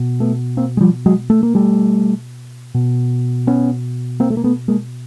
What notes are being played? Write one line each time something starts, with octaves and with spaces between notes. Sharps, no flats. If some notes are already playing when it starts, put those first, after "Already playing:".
Already playing: B2
A3 B3
A#3 C4
G#3
F3 G3
F#3 G#3
A3
A#3
G3 A3
B2
B3 C#4
A#3 C4
A3
A#3
A3 B3
G#3 A#3